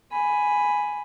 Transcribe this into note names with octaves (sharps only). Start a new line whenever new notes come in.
G#5 B5